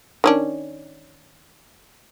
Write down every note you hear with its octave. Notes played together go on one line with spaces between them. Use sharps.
D#3 C#4 D4